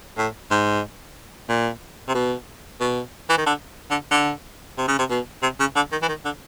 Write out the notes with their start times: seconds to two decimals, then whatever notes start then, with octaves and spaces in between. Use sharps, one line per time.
0.18 A2
0.51 G#2
1.49 A#2
2.09 C3
2.15 B2
2.80 B2
3.30 E3
3.38 D#3
3.46 D3
3.90 D3
4.11 D3
4.78 C3
4.88 C#3
4.99 C3
5.10 B2
5.43 C3
5.60 C#3
5.76 D3
5.92 D#3
6.02 E3
6.08 D#3
6.25 D3